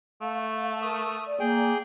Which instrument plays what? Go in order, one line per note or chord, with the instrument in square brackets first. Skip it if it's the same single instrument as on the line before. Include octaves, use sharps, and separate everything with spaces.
[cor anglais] A3 [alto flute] F5
[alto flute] A#4 [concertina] D#6
[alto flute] D5
[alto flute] A#3 [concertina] G#4 G5